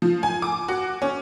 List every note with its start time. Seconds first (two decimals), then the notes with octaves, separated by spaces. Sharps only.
0.02 F3
0.23 G#5
0.42 D6
0.68 F#4
1.02 C#4